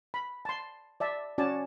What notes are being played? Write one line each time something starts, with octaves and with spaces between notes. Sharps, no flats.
B5
A5 C6
D5 E5 A5
C#4 F#4 D5 G#5 A5